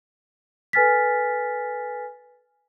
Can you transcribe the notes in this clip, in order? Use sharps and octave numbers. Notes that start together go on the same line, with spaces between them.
A4 B4 G#5 F6 A6 B6